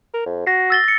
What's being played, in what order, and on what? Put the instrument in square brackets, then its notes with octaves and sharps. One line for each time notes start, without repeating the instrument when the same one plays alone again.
[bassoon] A#4
F2
[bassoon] F#4 [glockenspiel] A#6 C7
[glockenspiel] E6 A6 G7
A6 C#7